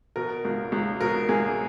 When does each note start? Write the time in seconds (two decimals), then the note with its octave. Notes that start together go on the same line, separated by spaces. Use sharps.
0.16 B2 A#4
0.45 C#2
0.72 C#2
1.01 B2 A#4
1.29 C#2 G#4